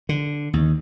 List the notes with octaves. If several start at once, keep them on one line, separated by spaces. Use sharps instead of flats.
D3
D#2